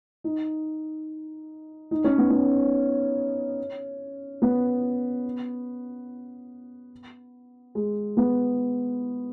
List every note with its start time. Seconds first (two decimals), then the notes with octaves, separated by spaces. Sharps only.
0.24 D#4
1.91 D#4
2.04 C#4
2.18 B3
2.30 C#4
4.42 B3
7.75 G#3
8.17 B3